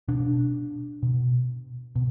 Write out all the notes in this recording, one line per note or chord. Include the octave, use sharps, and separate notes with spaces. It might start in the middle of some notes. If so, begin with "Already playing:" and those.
B2 D4
B2
B2